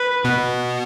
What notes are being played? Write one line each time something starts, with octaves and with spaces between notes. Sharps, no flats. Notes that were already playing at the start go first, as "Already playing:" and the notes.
Already playing: B4
B2 B3